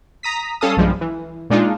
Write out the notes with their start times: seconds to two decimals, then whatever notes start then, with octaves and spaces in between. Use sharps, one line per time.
0.23 A#5 D#6 B6
0.61 G3 C#4 A4 F5 A5 D#6
0.77 B1 G2 F3 G3 G#3
1.01 E3
1.50 A#2 G#3 D4 D#4 F4